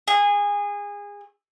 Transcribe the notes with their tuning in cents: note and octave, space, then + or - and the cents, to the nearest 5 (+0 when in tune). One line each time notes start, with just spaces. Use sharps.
G#4 -25